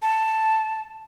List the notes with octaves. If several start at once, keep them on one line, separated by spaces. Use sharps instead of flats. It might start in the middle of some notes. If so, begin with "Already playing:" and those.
A5